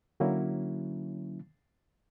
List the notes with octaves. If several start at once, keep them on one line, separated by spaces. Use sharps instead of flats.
D3 F#3 A#3 C#4 E4 F#4